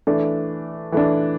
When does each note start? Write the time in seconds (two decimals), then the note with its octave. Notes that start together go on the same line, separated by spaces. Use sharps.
0.07 E3 A3 D4
0.92 E3 A3 D4